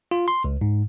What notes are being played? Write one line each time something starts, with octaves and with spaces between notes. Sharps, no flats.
F4
C6
C#2
G#2